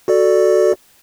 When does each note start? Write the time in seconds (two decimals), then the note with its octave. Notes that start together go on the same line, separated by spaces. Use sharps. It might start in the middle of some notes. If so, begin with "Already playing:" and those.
0.08 F#4 A4 D5